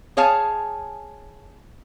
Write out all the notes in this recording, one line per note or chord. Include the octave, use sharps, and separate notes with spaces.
G#4 C#5 F5 G#5 A5